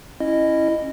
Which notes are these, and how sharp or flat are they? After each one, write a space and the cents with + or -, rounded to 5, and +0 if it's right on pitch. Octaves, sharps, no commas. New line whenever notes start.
C#4 -15 E4 +0 D#5 -10